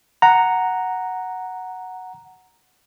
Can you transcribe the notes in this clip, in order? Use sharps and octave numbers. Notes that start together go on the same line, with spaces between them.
F#5 A#5